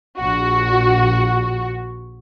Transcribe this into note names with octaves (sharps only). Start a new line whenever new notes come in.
A#1 F#4